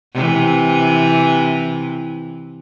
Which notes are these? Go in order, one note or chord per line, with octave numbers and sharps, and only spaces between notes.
C3 E3